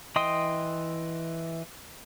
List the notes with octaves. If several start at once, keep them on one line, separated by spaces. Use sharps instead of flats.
E3 D#5 G5 C6 D#6